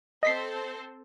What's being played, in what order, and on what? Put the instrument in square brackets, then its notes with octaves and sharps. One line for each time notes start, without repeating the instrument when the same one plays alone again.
[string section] C4 A4 C5 [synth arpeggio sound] D#5 B6 C7